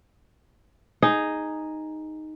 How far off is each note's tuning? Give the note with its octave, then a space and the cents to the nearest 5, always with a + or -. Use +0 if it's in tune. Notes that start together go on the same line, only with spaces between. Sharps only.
D#4 +0 G#4 +0